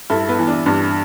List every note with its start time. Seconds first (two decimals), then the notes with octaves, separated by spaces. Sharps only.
0.10 G2 E4 A4
0.28 B3 E4
0.38 E3
0.47 D4
0.66 G2 D4